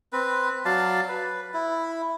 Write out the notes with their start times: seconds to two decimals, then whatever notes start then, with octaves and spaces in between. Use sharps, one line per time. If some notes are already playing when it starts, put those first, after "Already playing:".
0.13 C4 B4
0.65 F#3 D5 F5 A5
1.08 B4
1.54 E4